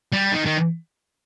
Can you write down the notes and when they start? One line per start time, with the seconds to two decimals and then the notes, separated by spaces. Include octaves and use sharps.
0.12 G3
0.32 D#3
0.46 D#3